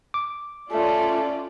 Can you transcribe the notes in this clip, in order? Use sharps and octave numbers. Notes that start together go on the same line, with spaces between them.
D6
A3 C#4 F4 D5